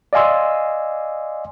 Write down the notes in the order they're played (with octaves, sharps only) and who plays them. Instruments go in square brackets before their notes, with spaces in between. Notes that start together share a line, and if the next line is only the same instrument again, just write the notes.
[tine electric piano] D5 D#5 F5 G#5 C6 E6